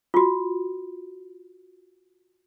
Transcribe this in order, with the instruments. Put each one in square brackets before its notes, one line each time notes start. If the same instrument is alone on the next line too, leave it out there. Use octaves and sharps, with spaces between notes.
[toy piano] F4 F#4